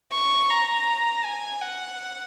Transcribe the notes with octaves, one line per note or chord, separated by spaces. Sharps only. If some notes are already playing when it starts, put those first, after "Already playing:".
C#6
A#5
G#5
F#5